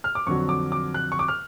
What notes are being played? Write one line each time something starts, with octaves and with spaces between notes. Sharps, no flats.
F6
D6
F2 D3 F#3 C#6
D6
D6
F#6
C#6
D6
F6